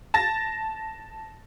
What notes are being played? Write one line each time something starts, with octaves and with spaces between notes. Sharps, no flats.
A5 A6 A#6